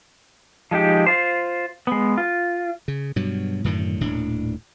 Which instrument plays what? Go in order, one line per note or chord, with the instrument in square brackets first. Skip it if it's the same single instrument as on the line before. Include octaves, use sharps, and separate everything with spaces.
[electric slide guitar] F3 G#3 D#4 G4
F4 C5
G#3 B3
F4
[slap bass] C#3
G2 B2 F#3
F#2 A2 D3 D#3
D#1 A2 D4